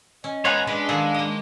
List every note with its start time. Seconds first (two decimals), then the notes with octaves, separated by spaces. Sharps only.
0.24 C#4 D#5
0.45 G#3 B3 F4 C#5 F#5 G#5 A#5 B5
0.67 G#3 D4 B4
0.89 D#3 G#4 A4 F5
1.14 A#3 D#5